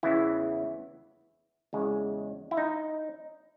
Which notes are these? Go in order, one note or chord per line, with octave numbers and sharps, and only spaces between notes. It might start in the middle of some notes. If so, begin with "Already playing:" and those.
E2 C#3 E3 E4
E2 C#3 G#3
E4
D#4